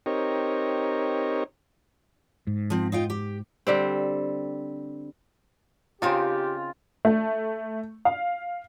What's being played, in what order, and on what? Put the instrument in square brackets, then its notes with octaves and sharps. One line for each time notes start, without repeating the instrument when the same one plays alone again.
[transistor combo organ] C4 D#4 G4 A#4 C#5
[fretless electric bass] G#2
[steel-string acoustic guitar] F3 C4
D#4 F4 G5
G4
[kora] D3 G3 C4
[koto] C#3 C4 D#4 [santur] F4 [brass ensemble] G4
[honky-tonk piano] A3
F5